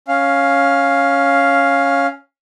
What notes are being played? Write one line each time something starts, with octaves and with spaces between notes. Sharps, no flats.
C#4 F5